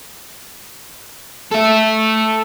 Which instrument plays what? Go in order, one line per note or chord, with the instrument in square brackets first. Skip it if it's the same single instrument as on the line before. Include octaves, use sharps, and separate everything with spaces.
[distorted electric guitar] A4 E5